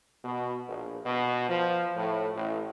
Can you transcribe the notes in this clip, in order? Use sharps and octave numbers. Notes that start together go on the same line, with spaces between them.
B2
A#1
B2
F3
A2
A1